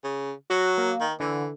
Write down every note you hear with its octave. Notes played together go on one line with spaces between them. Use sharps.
C#3
F#3 F#4
A#3
D#3
D3 E3